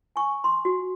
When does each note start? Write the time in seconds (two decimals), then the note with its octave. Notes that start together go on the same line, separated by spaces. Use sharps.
0.16 G#5 C#6
0.44 C6
0.65 F#4